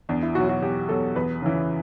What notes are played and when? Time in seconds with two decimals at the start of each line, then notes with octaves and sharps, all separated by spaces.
0.09 E2 D4
0.23 E4
0.35 B2 F#3 F#4
0.49 F#4
0.62 E2 G4
0.89 B2 F#3 A4
1.16 E2 B4
1.42 C#3 E3